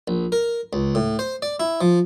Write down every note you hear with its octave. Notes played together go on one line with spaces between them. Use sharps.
A#1
A#4
C#2
A2
C5
D5
E4
F3